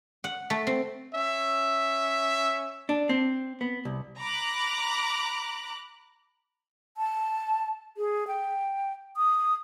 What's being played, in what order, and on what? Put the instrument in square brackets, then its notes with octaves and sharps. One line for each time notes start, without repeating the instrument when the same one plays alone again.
[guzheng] F#5
A3
C4
[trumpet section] C#4 E5
[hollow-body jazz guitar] D4
C4
B3
C2
[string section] A#5 B5 D6 F#6
[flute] A5
G#4
G5
D#6